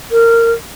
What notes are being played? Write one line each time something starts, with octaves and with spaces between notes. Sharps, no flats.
A#4